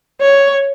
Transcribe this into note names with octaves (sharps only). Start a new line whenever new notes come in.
C#5